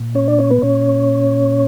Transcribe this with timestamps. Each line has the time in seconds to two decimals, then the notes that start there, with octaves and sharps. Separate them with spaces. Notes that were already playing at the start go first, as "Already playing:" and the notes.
Already playing: A#2
0.15 C#4 C#5
0.27 D4 D5
0.38 C#4 C#5
0.50 B3 B4
0.62 A#2 C#4 C#5